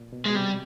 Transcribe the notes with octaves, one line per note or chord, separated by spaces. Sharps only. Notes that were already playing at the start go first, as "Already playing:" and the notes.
Already playing: A#2
B2
B2 G#3
C3 G3